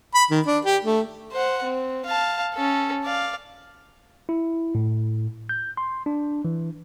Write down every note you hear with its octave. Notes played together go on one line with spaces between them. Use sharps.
B5
D#3
D4
G4
A3
C5 F#5
C4
F5 A5
C#4 A4
D5 F5
E4
A2
G6
C6
D4
E3